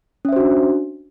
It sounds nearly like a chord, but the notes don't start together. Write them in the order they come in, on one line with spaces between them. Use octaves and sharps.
C#4 E5 C5 F#4 D4